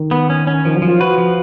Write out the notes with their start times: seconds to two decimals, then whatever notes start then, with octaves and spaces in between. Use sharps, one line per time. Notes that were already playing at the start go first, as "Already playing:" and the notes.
Already playing: D#3
0.11 B3
0.30 C#4
0.47 C#4
0.65 D#3 F3
0.76 F#3
0.82 F3
0.88 F4
1.00 F#4 B4
1.18 F3